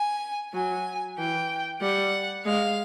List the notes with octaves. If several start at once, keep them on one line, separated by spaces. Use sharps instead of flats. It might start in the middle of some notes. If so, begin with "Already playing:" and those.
Already playing: G#5
F#3 G#5
E3 G5
G3 F#5
G#3 F5